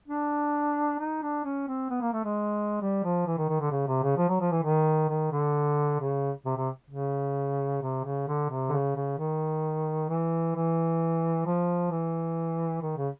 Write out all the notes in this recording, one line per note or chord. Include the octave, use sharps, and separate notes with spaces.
D4
D#4
D4
C#4
C4
B3
A#3
A3
G#3
G3
F3
E3
D#3
D#3
D3
C#3
C3
C#3
F3
F#3
F3
E3
D#3
D#3
D3
C#3
C3
C3
C#3
C3
C#3
D3
C3
D3
C#3
C#3
D#3
E3
E3
F3
E3
D#3
C#3